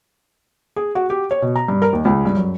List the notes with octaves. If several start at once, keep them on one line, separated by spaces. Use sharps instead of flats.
G#4
F#4
G4
C#5
B2
A#5
G2
A#4
D#2
C#2
G2
F#2